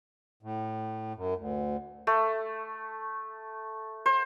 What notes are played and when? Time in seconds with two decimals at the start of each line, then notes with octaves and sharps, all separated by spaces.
0.43 A2
1.15 F#2
1.37 D2
2.07 A3
4.06 C5